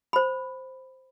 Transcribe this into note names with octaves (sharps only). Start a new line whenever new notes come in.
C5 B5